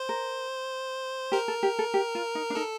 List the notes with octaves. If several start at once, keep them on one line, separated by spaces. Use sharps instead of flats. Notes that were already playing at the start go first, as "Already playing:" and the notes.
Already playing: C5
A#4
G4 A#4
A4
G4
A4
G4
F4
D#4
D4
D#4 A4